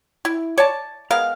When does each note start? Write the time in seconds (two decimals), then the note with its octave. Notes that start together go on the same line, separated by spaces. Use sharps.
0.25 E4
0.58 C#5 D5 A5
1.10 G#3 B3 A#4 F5